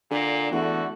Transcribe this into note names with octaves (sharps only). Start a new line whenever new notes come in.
A#2 D3
E2 D3 A3 F#4